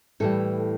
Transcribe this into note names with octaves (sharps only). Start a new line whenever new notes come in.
A2 E3 G3 A4